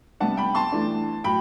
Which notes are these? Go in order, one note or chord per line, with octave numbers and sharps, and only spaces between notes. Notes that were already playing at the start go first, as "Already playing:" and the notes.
C3 G3 B3 D4 F#5 A5
G5 B5
A5 C6
E3 A3 D4
A2 F#3 G5 B5